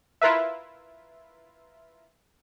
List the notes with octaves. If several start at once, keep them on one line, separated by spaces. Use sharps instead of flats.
E4 F4 A#4 B4 E5